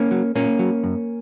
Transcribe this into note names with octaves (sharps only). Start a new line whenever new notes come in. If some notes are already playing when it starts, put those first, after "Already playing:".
Already playing: A#3 C#4
F#3
A#2 A#3 C#4
F#3
F#2